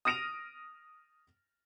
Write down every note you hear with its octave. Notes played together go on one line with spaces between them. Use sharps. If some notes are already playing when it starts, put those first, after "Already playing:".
D#6 F6 A#6 D7 D#7 F7